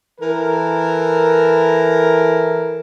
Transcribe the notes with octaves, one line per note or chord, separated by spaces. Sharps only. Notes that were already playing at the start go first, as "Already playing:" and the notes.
E3 A4 A#4